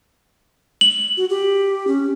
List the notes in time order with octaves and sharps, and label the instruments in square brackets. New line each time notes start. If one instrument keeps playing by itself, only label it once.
[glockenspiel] F#7
[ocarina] F#4
G4
C#4